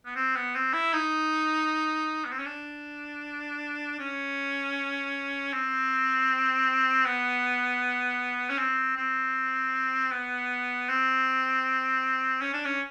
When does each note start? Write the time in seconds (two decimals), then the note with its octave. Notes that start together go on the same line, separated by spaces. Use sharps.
0.06 B3
0.16 C4
0.36 B3
0.55 C4
0.74 E4
0.93 D#4
2.25 B3
2.32 C4
2.39 C#4
2.46 D4
3.99 C#4
5.53 C4
7.05 B3
8.50 C#4
8.58 C4
8.97 C4
10.11 B3
10.89 C4
12.41 C#4
12.53 D4
12.65 C#4